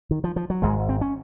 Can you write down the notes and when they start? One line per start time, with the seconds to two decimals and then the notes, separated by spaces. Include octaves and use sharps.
0.11 D#3
0.24 F3
0.36 F3
0.50 F#3
0.62 G#1 G#2 G#3
0.89 C4
1.01 C#4